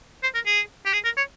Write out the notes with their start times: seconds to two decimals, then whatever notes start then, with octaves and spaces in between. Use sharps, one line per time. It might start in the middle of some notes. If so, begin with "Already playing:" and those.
0.23 C5
0.35 A#4
0.46 G#4
0.86 G4
0.93 G#4
1.05 A#4
1.17 C#5